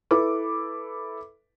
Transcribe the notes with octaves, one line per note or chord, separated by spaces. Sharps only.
E4 A4 B4 D6